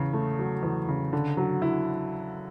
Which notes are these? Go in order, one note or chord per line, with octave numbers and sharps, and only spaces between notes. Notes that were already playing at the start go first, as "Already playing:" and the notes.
Already playing: E2 C#3
A3
F#3
E2
C#3
D3
F#3
E4